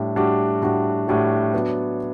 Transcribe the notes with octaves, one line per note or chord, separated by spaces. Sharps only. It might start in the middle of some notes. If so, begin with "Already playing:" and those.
Already playing: A2 G3 D4
A2 G3 D4 F#4
A2 G3 D4 F#4
A2 G3 D4 F#4
F#3 B3 D4